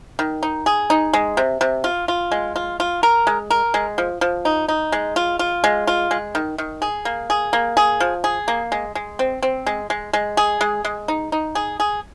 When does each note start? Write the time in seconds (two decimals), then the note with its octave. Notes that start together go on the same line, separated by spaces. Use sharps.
0.19 D#3
0.43 D#4
0.66 G#4
0.90 D#4
1.13 G#3
1.37 C3
1.61 C3
1.84 F4
2.08 F4
2.31 G#3
2.56 F4
2.80 F4
3.03 A#4
3.27 G#3
3.50 A#4
3.74 G#3
3.98 F3
4.21 F3
4.45 D#4
4.68 D#4
4.92 G#3
5.16 F4
5.39 F4
5.64 G#3
5.87 F4
6.11 G#3
6.35 D#3
6.58 D#3
6.82 G#4
7.05 A#3
7.30 G#4
7.53 A#3
7.77 G#4
8.00 F3
8.24 G#4
8.48 A#3
8.72 G#3
8.95 G#3
9.19 C4
9.43 C4
9.66 G#3
9.90 G#3
10.13 G#3
10.37 G#4
10.61 G#3
10.85 G#3
11.08 D#4
11.32 D#4
11.55 G#4
11.80 G#4